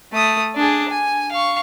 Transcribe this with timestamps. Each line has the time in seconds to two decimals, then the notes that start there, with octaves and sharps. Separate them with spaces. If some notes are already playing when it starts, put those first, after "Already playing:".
0.12 A3 D#6
0.55 D4 G#4
0.90 G#5
1.32 F5 C#6